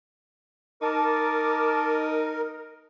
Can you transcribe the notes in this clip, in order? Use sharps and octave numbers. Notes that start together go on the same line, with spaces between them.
D#4 A#4 A5 D6